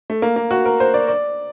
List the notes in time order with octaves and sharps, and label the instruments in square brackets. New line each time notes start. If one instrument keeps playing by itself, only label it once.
[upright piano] A3
A#3
A#3
F#4
A#4
C5
D5
D5